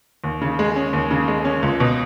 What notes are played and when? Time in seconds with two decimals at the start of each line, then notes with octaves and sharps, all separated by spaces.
0.24 D#2
0.41 C#3
0.59 G#3
0.76 C#4
0.93 D#2
1.11 C#3
1.28 G#3
1.45 C#4
1.63 C#2
1.80 B2